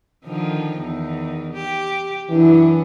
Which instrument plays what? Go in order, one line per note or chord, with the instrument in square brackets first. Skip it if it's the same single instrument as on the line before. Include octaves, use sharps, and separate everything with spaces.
[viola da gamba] D3 D#3 F3
E2 D#3
G4
[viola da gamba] F#2 C#4 D4 [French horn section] E3